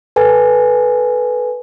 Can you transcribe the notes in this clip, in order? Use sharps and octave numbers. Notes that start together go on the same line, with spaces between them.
A4 B4 G#5